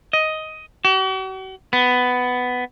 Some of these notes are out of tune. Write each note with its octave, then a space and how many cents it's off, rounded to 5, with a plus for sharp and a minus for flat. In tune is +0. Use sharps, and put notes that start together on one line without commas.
D#5 +10
F#4 +45
B3 +10